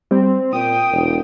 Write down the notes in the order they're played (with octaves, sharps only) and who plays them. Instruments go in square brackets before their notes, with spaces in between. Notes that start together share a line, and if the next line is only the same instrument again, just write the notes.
[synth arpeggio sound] G3 [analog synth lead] C4
[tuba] A#2 [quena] G5 [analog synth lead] D#6
[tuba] E1